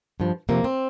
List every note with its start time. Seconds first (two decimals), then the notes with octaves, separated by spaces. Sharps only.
0.20 G2 F3
0.49 F2 C3 F3 A#3
0.64 C4